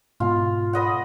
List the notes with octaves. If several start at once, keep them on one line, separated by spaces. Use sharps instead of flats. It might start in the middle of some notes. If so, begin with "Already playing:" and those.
G#2 B2 F4
B4 D#5 F#5